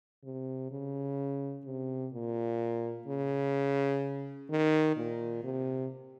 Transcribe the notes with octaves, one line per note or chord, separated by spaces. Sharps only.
C3
C#3
C3
A#2
C#3
D#3
A#2
C3